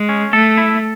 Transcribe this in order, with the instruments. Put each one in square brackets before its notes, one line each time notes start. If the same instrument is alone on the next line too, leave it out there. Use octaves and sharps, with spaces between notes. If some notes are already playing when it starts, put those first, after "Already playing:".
Already playing: [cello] G#3
[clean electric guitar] C#4
[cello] A3 [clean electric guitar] A4
[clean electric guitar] E4